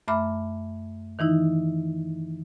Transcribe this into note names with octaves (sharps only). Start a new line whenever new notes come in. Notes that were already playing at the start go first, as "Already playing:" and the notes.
F#2 A3 E5 B5 D6 F6
D#3 E3 D#4 E4